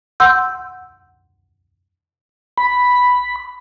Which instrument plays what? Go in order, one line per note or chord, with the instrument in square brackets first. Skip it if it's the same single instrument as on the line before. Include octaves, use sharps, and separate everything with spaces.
[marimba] F#5 C6 E6 G6
[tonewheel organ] B5